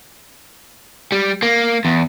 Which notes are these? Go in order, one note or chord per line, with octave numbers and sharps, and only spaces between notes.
G3
A#3
E2